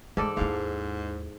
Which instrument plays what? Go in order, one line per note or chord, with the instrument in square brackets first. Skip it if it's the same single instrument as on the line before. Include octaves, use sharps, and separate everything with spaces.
[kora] G#2 A4 D5 [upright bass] E3 G#3
[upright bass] D#2 E4 [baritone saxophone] G#2 [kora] F5